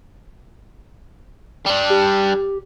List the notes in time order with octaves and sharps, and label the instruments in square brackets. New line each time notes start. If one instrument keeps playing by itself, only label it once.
[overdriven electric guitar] G3 D4
[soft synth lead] G4